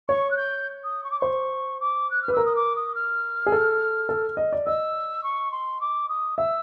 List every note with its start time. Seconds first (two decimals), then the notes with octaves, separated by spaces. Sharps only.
0.08 C#5 C#6
0.31 F#6
0.37 G6
0.84 D#6
1.04 C#6
1.11 D6
1.20 C5 C#6
1.80 D6
2.10 F#6
2.22 F6
2.28 B4
2.33 A#4 E6
2.46 D#6
2.56 D6
2.76 D#6
2.95 F6
3.46 G#4
3.52 A4
4.09 A4
4.37 D#5
4.52 D5
4.66 D#5 E6
5.23 C#6
5.52 C6
5.81 D6
6.09 D#6
6.38 E5 E6